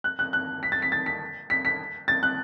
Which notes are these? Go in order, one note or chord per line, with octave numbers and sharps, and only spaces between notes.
F#6
F#6
F#6
B6
A6
B6
A6
B6
B6
B6
A6
F#6